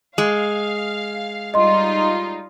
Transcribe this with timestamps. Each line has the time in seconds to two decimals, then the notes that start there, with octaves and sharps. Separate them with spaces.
0.18 G#3 F5
1.54 G3 D#4 F4 D#5 C6